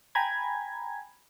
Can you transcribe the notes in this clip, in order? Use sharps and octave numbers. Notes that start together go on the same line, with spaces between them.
G5 G#5 A#5 B5 G#6